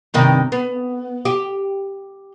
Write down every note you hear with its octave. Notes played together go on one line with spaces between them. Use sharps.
G2 C3 D#3
B3
G4